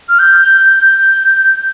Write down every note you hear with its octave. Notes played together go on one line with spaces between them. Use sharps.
F6
G6
G6